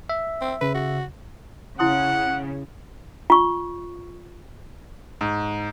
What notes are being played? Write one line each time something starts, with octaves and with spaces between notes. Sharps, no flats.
E5
C4
C#3 B4
F#4
C#3 E4 F#5 C6 D#6
F4 C#6
G#2